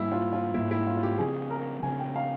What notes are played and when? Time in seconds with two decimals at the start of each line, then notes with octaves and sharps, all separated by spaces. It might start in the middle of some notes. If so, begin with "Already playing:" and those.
Already playing: G#2 G3 A#3 E4
0.12 F4
0.33 F4
0.54 G#2 G3 A#3 E4
0.71 E4
0.87 F4
0.97 F4
1.03 G4
1.18 C#3 F3 C4 G#4
1.51 A#4
1.83 C#3 F3 C4 G#5
1.99 G5
2.16 F5